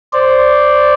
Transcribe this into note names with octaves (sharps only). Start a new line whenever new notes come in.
C5 D5